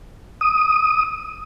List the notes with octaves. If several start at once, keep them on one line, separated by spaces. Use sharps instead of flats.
D#6